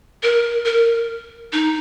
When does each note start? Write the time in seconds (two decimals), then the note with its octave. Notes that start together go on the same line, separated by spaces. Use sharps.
0.23 A#4
0.65 A#4
1.53 D#4